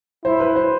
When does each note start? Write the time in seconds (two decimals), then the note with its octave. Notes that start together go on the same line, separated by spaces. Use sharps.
0.25 E4 C5
0.40 B4
0.56 C5